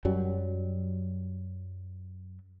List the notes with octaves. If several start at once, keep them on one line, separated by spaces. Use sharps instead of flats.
F#2 F#3 G3